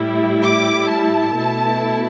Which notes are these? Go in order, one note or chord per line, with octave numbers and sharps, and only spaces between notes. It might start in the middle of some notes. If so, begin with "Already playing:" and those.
Already playing: A2 G3 E4
D6
A5
B2 A3 E4